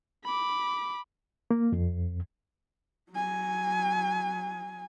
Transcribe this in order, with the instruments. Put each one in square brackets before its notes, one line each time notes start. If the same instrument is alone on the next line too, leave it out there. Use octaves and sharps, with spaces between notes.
[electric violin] B5 D6
[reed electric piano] A#3
F2
[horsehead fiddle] F#3 G#5